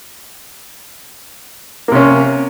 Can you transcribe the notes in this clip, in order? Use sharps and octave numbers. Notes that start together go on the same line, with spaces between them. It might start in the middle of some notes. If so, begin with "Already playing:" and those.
C3 A#3 C#4